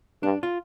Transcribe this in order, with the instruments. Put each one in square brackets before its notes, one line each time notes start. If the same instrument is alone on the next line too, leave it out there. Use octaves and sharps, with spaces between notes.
[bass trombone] G2 [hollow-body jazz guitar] D4
[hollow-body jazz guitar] F4